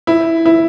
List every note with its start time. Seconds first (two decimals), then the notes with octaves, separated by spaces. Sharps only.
0.07 E4
0.46 E4